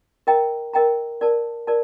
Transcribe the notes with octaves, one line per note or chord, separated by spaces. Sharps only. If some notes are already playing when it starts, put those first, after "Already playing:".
A#4 D#5 G5 A#5
A#4 D#5 G5 A#5
A#4 D5 A5
A#4 D5 A5